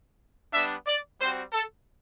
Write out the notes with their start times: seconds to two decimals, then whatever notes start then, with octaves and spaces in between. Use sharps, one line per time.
0.52 G3 B3 D4 E5
0.86 D5
1.19 G3 C4 F#4 C5
1.52 A4